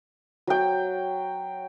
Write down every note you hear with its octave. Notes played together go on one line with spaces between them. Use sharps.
F#3 G5